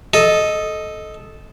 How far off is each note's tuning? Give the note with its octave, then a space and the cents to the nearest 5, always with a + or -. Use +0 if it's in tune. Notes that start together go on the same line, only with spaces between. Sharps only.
A4 -10 D#5 +0